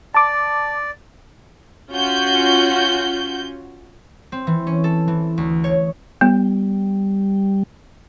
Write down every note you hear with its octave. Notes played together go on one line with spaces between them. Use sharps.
D5 A5 D6
C#4 F4 F#4 G6
C4
E3
C#4
A4
E3
D2
C#5
G3 B3